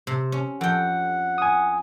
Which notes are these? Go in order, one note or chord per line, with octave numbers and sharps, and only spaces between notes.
C3
C#4
F2 F#5 G5
G#5 D#6